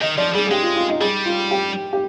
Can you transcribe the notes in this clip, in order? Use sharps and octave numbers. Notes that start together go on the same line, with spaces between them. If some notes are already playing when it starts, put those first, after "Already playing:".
D#3 D#5
F3 D5
G3 G#4
G#4
G#3 G4
F4
F4
D#4
G3 G#4
F4
G4
G4